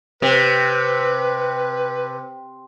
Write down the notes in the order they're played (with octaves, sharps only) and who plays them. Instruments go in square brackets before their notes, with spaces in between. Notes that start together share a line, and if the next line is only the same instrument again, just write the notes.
[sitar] C3 [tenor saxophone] B4